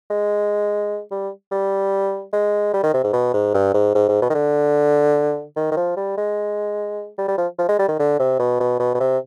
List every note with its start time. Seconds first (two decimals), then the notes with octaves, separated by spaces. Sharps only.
0.10 G#3
1.11 G3
1.52 G3
2.33 G#3
2.74 G3
2.83 D#3
2.94 C3
3.04 G#2
3.13 B2
3.34 G#2
3.54 G2
3.74 G#2
3.95 G#2
4.08 G#2
4.22 B2
4.30 D#3
4.35 D3
5.56 D#3
5.71 D#3
5.77 F3
5.97 G3
6.17 G#3
7.18 G3
7.28 G3
7.38 F3
7.58 F3
7.69 G#3
7.79 G3
7.89 D#3
7.99 D3
8.19 C3
8.39 B2
8.60 B2
8.80 B2
8.94 B2
9.00 C3